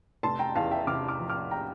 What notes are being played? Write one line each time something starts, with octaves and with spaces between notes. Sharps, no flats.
F1 A5 C6
G5 A#5
E2 F5 A5
E5 G5
C3 D6 F6
D6 F6
F3
D6 F6
G5 A#5